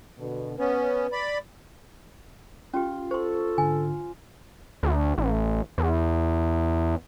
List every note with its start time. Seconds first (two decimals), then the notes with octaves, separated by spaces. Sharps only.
0.19 B2 D3
0.59 B3 C#4 B4
1.12 D5 B5
2.73 C#4 F4 G4
3.11 A4 C5 C6 C#6
3.58 G#2 D3 G#5
4.83 D2
5.18 A1
5.78 E2